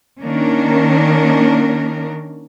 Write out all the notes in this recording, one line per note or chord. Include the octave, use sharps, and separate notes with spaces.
D#3 A#3 C#4 D4 A#4